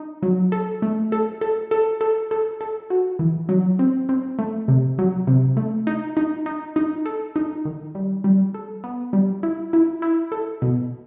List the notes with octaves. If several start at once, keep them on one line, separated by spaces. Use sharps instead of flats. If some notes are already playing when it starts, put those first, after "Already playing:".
Already playing: D#4
F#3
A4
A3
A4
A4
A4
A4
A4
A4
F#4
E3
F#3
C4
C4
A3
C3
F#3
C3
A3
D#4
D#4
D#4
D#4
A4
D#4
D#3
G3
G3
A4
B3
G3
E4
E4
E4
A4
B2